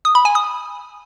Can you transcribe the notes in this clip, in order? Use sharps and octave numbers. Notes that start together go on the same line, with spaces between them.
D#6
B5
G#5
D#6